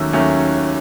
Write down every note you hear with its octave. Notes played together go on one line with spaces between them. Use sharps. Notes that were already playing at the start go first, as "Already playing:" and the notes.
Already playing: D#2 D#3 F#3 A3 C#4 E6
D#2 D#3 F#3 A3 C#4